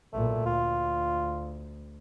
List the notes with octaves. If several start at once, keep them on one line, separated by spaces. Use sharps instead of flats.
B1 A#2 A3
D2 F4